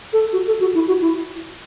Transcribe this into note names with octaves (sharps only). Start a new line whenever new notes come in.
A4
F#4
A4
F#4
E4
F#4
E4